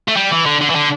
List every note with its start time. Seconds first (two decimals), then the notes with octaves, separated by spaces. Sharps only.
0.08 A3
0.17 G3
0.31 E3
0.46 D3
0.61 D3
0.70 E3
0.75 D3